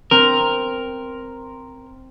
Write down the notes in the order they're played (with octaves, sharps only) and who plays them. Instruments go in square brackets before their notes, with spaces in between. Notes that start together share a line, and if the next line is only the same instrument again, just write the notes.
[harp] C4 [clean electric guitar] A#4